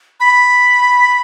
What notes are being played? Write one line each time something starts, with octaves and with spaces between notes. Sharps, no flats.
B5